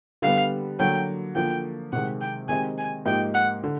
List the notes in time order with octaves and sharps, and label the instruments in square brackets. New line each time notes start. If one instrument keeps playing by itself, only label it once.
[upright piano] D3 G3 B3 [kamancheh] F5
[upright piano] D3 F#3 A#3 [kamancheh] G5
[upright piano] D3 F3 A#3 [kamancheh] G5
[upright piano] C3 D#3 G#3 [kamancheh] F#5
[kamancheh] G5
[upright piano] D#3 G#3 C4 D#4 G4 [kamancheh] G#5
[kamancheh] G#5
[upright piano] G#2 F3 A#3 D#4 G4 [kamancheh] G5
[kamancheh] F#5
[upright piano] D3